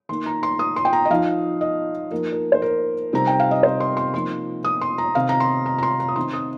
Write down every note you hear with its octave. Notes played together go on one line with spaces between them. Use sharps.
D#3 A#3 D#4 C6
A#5
C6
D#6
C6
G5
A#5
D#5
F3 D#4 F5
D#5
F3 A#3 D#4 A#4
A#4
C5
A#4
C3 G3 C4 D#4 A#5
G5
F5
D#5
C5
C6
C6
F3 A#3 D#4 C6
D#6
C6
A#5
C3 D#3 C4 D#4 F5
A#5
C6
A#5
A#5
C6
A#5
D#6
D#3 C4 D#4 C6
D#6